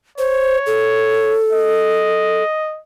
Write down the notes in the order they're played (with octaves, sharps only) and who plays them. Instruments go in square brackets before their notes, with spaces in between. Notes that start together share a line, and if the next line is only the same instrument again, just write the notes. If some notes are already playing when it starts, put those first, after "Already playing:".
[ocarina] C5 [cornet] C#5
[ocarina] A4
[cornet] D#5